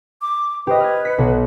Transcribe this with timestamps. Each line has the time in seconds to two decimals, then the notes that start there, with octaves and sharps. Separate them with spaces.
0.22 D6
0.67 G4 B4 C5 D#5
0.80 F6 G#6
1.05 B6 C#7
1.18 B1 F#4